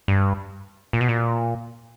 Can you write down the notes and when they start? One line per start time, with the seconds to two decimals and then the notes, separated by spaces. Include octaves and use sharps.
0.08 G2
0.93 A#2
1.01 B2
1.08 A#2